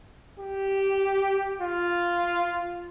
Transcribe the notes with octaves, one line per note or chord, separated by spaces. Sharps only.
G4
F4